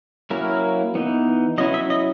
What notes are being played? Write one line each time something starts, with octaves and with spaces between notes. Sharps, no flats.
F#3 A#3 C#4 E4 A#4
E3 B3 D#4
F#3 C#4 E4 D#5
E5
D#5